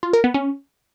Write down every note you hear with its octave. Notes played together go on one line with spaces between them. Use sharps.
F4
A#4
B3
C#4